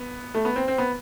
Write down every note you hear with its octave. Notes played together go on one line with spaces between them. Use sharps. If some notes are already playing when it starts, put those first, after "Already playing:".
Already playing: B3
A3
B3
C4
C4
B3